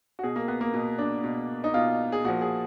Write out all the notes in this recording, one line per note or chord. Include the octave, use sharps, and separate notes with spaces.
F#4
B2 G#4
A#3
B3
A#3
B2
D4
B2
D#4
B2 F4
G#4
A#2 F3 F#4
G#4